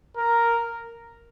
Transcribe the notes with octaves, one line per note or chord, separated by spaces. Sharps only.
A#4